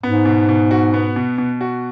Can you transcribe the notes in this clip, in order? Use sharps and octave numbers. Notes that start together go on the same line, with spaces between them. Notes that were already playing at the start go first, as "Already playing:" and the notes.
G#2 B3
B2
B2
F#4
B3
B2
B2
F#4